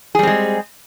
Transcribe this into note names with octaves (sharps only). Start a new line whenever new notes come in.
G3 G#3 C4 G#4